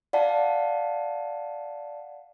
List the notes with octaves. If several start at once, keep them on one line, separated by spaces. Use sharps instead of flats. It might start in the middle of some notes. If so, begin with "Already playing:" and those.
D5 F5 F#5 A5